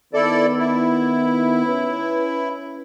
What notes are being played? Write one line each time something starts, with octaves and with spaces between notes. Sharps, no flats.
D#3 B3 E4 A4 D5
E4
C#4 B4